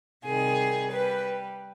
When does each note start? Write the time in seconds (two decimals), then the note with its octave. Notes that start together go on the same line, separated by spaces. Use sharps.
0.25 C3 D#3 G3 G#4
0.90 G3 B4